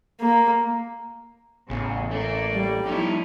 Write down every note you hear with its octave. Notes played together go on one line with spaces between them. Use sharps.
A#3
A1 E2 C#3
A3 A#3 D5
G3
F3 A3 C#4 D#4 E4